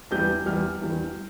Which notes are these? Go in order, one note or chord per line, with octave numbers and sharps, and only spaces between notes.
E2 E3 G3 G6
E2 E3 G3 F6
E2 E3 G3